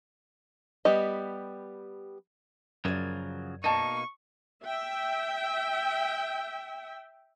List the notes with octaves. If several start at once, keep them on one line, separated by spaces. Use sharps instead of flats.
G3 B3 G4 D#5
F#2 C#3 F3 F#3 A#4 D5 G#6
B2 A#3 D#4 D5 D#5 A5 C#6
E5 G5